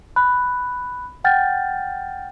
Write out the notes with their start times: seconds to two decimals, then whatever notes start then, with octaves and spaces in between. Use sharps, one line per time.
0.16 B5 F#6
1.24 F#5 G5 F6 G6 A6